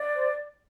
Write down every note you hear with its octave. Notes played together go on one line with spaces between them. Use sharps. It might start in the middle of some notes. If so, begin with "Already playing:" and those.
Already playing: D5
C5